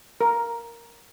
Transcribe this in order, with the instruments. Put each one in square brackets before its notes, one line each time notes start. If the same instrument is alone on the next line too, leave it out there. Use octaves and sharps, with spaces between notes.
[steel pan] A#4